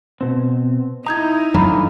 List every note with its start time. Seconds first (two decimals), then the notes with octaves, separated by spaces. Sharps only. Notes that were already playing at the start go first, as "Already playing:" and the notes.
0.21 B2 C4
1.06 D#4 E4 A#5 D#6 G6 G#6
1.54 F#2 D3 E3 F#3 F4 A#5 B5